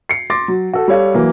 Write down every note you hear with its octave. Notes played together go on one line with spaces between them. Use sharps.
C7 C#7
C6 D6 A6 A#6
F#3
F#4 A4
G3 A4 C#5 F5
E3 F#3 A#3